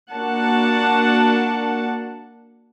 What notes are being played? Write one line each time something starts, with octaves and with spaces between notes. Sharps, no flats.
A#3 D4 F#4 F#5 A5